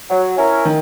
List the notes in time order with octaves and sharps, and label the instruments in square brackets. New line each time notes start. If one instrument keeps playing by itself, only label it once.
[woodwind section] F#3
C#4 E4 A#4
[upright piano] D#3